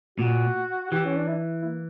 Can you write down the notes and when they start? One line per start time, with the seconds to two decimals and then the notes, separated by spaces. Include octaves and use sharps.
0.18 A#2 F#4
0.91 E3 G4
1.05 C#4
1.16 D4
1.28 E4
1.65 A#3